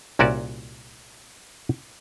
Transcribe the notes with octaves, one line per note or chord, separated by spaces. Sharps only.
C2 A#2 C#4 F#4 A#4 D5